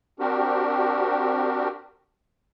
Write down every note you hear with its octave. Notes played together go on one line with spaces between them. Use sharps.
C4 D4 F#4 G4 A#4